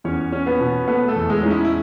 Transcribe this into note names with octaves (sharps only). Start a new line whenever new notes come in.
E2 C#4 C#5
C#4
B3 B4
B2
A3 B3 B4
A3 A4
E2
G#3 G#4
C#4 D#4
E4
E4